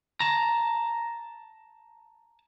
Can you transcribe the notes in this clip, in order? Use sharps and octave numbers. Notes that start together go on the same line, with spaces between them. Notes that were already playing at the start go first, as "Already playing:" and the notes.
A5 A#5